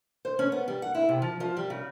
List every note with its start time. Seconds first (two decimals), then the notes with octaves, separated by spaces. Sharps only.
0.25 C5
0.39 C#4
0.52 B3
0.68 G3
0.82 F#5
0.95 E4
1.09 C3
1.22 F3
1.40 F3
1.57 G3
1.70 C#3